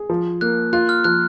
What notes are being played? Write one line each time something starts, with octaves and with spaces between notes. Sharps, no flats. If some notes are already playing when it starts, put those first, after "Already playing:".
Already playing: G#4
F3
A#3 F#6
F4 F#6
F6
F3 F#6